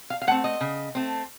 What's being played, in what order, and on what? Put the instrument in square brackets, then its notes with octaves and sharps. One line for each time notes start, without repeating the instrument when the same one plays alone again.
[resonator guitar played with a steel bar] F5
F5
A3 F#5
C4
D#5
C#3
A3 C4